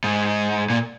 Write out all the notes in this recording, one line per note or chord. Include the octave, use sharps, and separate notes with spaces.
G#2
A#2